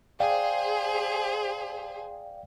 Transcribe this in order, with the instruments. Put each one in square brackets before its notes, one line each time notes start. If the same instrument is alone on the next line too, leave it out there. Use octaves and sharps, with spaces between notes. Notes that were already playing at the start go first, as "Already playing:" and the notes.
[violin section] G#4 C5 [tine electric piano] D5 F5 G5